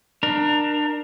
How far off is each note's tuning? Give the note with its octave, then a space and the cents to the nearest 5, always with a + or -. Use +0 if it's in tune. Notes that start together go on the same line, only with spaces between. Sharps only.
D4 +30 A#4 +10